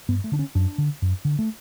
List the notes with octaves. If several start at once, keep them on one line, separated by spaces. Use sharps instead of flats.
G2 B3
A3
D3 D4
C#4
F#2 D4
D3
F#2
D3
A3